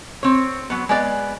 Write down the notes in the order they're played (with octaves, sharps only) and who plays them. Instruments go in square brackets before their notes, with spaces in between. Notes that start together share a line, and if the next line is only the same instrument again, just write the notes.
[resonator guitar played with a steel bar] C4 C#5
F#3 B3
G#3 B3 D5